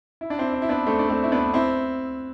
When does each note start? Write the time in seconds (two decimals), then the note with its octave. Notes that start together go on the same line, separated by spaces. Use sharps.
0.21 E4
0.30 D4
0.39 C4 E4
0.53 D4
0.62 E4
0.69 B3 D4
0.87 A3 C4
0.99 D4
1.09 A3 C4
1.23 E4
1.32 B3 D4
1.54 C4 E4